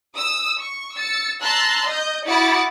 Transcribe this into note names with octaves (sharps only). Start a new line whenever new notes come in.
D#6 E6
C#6
E6 A6 C#7
A5 A#5 C6 E6 F#6 A6
D#5 G6
E4 F#4 D6 D#6 A6 C#7